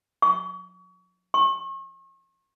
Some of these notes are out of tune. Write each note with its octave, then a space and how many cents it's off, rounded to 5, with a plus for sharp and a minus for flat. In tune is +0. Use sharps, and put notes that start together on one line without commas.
C#6 +30
C#6 -40